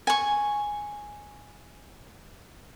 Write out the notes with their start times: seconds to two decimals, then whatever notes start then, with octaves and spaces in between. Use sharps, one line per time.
0.07 G#5 C#6